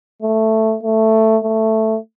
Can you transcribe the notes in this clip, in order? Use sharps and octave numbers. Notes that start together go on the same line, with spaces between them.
A3
A3
A3